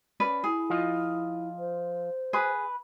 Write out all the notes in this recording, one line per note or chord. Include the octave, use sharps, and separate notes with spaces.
C#4 B4 D5
E4 G#4
F3 F4 D#5
C5
G#4 B4